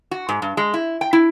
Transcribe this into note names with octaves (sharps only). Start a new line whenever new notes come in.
F#4
G#2
G2
G#3
E4
G5
E4